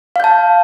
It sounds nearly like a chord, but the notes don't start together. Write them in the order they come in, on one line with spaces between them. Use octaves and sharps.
F5 G6 A5